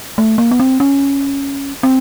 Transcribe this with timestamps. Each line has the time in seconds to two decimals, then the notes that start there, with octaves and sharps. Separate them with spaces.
0.18 A3
0.38 A#3
0.51 B3
0.60 C4
0.80 C#4
1.83 C4